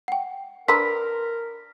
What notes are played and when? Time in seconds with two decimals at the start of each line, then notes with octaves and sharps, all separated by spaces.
0.08 F#5 G5
0.68 D4 A#4 B4 A#5 C6 E6 B6